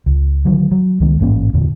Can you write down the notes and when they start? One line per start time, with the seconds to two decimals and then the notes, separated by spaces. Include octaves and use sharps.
0.06 C#2
0.45 D3 D#3 F#3
0.71 F#3
1.00 C#2 D#3 G#3
1.20 A1 G#2 A#3 C#4
1.54 E2 A#2 D3